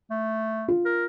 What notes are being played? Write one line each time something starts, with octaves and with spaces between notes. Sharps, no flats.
A3
F4
A#4